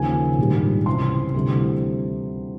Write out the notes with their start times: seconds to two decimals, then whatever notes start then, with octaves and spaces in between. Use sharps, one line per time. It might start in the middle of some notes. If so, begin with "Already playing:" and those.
Already playing: D#2 C#3 F3 G#5
0.38 A#1 G#2 D#3 G3
0.86 C#2 C3 E3 C6
1.34 D2 C3 E3 G3